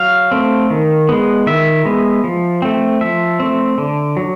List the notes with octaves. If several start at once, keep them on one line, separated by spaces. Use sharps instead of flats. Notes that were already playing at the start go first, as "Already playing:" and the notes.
Already playing: F#3 F5
A3 C4
D#3
G#3 B3
D#3 E5
G#3 B3
F3
A3 C4
F3 E5
A3 C4
D3
F#3